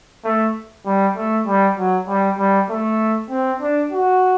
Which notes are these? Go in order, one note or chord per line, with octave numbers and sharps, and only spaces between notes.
A3
G3
A3
G3
F#3
G3
G3
A3
C4
D4
F#4